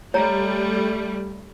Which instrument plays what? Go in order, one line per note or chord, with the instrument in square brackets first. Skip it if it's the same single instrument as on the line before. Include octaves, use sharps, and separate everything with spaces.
[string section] G3 A3 [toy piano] C#5 A#5